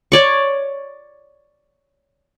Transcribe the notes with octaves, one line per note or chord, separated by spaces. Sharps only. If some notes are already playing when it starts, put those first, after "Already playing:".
C#5 D5 C#6